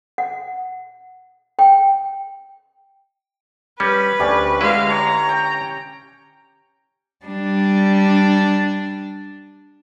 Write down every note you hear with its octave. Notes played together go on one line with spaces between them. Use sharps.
F#5
G5
G3 C#4 B4
D2 C#4 D4 G4
D3 G#3 E4 B4 F5
C#5 A#5
G5
G3 D4